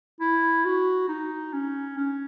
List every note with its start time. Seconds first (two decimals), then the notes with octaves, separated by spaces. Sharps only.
0.20 E4
0.65 F#4
1.08 D#4
1.53 C#4
1.97 C#4